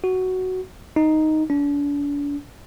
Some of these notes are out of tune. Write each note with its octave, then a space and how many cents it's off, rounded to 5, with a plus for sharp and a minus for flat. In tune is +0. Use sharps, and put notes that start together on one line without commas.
F#4 +5
D#4 +0
D4 -40